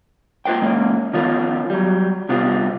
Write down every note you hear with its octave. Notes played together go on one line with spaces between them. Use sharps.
A#3 F4 B4 C5 G5
G#3 A#3 C#4
D#3 F3 B3 C#4 F4 A#4
F#3 G3
C3 G3 B3 C4 F4 G4